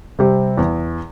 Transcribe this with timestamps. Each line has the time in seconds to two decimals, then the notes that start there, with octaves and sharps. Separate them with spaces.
0.19 C3 G3 C4
0.58 E2